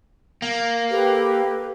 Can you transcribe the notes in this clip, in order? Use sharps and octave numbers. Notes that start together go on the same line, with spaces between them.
A#3
G4 A4 B4